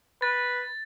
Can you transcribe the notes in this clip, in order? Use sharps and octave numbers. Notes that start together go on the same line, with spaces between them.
B4 A6